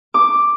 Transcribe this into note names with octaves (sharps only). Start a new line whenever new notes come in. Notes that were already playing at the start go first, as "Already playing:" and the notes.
D6